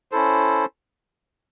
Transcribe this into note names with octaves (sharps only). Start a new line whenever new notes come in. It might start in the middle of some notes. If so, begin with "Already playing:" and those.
C#4 E4 A4 C5